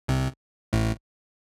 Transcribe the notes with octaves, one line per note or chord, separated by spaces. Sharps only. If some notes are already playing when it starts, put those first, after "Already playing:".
C2 C3
A1 A2